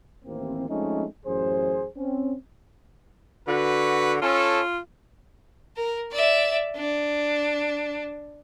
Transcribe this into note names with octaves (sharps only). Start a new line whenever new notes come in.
A1 D#2 E3 A#3 C4
F3 G#3 A3 C4 C#4 D#4
A1 F#2 G#4 C5
C4 C#4
D3 F#4 B4
C#4 F4 A4
A#4
D5 E5
D4